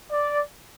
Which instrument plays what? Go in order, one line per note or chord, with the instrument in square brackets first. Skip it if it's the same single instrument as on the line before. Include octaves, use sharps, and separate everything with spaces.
[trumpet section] D5